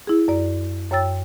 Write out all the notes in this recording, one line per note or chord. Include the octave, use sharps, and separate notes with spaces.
E4 G#4
F#2 D5
F#2 C#5 G5 E6 A6